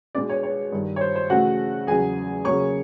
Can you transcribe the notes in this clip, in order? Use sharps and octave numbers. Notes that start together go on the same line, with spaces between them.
B2 G#3 B3 D4 D5
C#5
C#5
G2 D#3 G3
C#5
C5
C5
C#3 E3 A3 F#4 F#5
E2 C#3 F#3 G#4 G#5
C#3 F#3 A#3 C#5 C#6